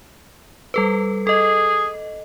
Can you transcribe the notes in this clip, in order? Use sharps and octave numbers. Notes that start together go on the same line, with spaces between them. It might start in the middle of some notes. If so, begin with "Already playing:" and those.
G3 A4 B4
G#4 A4 D#5